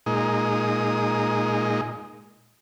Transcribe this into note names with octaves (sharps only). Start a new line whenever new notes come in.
A#2 G#3 D#4